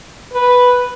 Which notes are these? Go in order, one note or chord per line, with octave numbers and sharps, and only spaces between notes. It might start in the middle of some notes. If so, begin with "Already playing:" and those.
B4